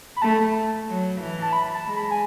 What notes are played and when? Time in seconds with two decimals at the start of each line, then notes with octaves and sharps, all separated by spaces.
0.16 B5
0.21 A3 A5
0.88 F#3
1.20 E3
1.42 A5
1.53 B5
1.74 A5
1.85 G#3
1.96 B5
2.11 G#5